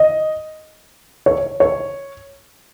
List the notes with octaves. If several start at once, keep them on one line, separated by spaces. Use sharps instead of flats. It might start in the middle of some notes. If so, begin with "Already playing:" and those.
Already playing: D#5
C#5
C#5